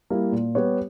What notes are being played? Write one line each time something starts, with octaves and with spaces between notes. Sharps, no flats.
G3 A#3 E4 A#4
A#2
G3 B3 G4 C#5